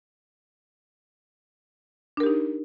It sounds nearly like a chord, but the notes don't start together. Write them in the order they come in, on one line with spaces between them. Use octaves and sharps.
D4 A#4 G4 D#4